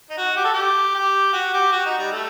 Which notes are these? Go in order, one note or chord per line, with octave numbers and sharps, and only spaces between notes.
D#4
F#4
G4
A4
G4
G4
F#4
G4
F#4
D#4
G3
A3